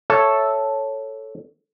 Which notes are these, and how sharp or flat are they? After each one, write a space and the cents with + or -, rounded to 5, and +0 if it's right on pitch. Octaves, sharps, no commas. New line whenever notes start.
A4 +0 C#5 +0 E5 +0